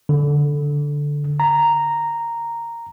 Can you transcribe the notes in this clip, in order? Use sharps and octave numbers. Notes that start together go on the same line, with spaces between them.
D3
A#5